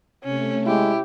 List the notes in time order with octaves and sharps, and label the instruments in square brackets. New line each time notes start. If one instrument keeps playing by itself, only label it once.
[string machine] C3 A3 [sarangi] C#4
[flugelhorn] G#3 [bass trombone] E4 [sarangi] G4